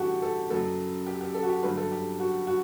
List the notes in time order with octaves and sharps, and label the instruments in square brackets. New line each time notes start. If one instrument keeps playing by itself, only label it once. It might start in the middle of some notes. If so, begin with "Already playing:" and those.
Already playing: [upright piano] A1 G2 E3 G3 F#4 G4 A4
A4
F#1 F#2 F#3 A4
G4
G4
A4
F#4
G4
G1 G2 F#3 B4
A4
G4
F#4
F#4